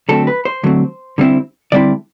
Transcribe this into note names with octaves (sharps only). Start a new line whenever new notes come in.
D3 F#3 A3 C4 A4
B4
C5
D3 F#3 A3 C4
D3 G3 C4 E4
D3 G3 C4 E4 D5